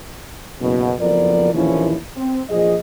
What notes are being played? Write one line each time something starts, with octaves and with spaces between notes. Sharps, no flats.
F#1 B2
F#1 F2 F3 B3 A#4 D5
A#1 D#2 E3 F3 C#4 E4
C4
A#1 F3 G#4 D#5